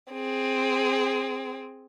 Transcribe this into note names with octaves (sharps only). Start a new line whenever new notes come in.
C4 G#4